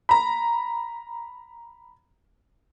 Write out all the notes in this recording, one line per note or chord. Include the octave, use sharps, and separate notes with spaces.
A#5 B5